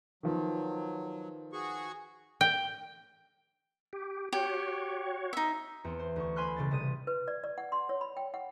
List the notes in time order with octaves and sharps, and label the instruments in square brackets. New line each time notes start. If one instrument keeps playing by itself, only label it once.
[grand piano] D#3 F3 B3 [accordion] F#3
[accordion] F#4 G#4 C#6
[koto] G5
[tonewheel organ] G4
[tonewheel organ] F#4 C#5 [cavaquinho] G4
[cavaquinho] D#4 E5
[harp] E2 C4 C#7
C5
D2 C#6
C5 G#5 B5 C6 F6 F#6
E1 C#3 C#4 A6
A1 C3 G3 D#6 D#7
[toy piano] B4
D5
D5
F#5
C6
C#5
B5
G5
F#5